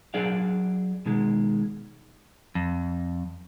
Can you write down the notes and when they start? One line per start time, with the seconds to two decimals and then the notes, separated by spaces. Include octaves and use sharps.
0.14 F#3 D4 G#4 D5 F5
1.06 B2 D#3 G#3
2.55 F2